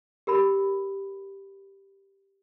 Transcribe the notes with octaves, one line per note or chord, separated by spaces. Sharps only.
G4 A#4 B5